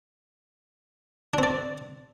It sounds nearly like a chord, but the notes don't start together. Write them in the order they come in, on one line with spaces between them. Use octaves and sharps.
D4 C4 D5